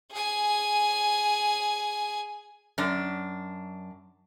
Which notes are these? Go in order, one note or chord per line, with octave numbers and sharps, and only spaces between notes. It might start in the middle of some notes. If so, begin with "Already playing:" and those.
G#4 G#5
F#2 D4